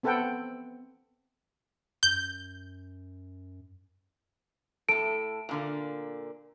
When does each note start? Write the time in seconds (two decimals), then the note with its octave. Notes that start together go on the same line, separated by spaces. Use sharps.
0.03 B3 C4 A4 B4 F#5 G5
2.03 F#2 G6
4.89 A2 A4 D7
5.49 A#2 D3 A#3